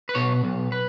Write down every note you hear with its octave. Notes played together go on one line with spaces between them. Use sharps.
B4
B2 C#5
B1
B4